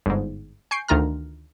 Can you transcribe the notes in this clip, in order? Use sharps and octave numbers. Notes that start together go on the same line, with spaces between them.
G1 G#2
G#5 C#6 G6 C7 D7
D2 D#3 F4 A#5 F6